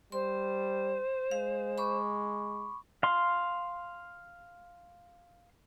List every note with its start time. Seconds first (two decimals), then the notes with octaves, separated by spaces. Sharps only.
0.12 G3 C5 C6
1.31 G#3 F5
1.78 B5 C#6 D6
3.03 F5 C6